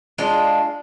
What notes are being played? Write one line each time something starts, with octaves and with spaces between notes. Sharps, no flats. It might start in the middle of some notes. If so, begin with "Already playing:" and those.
G#3 D4 F4